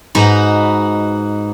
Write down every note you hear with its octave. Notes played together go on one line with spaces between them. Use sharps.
G#2 D#4 F#4 B4 A#5